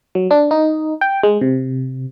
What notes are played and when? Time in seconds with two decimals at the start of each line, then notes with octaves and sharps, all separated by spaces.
0.15 F#3
0.31 D4
0.51 D#4
1.01 G5
1.23 G#3
1.41 C3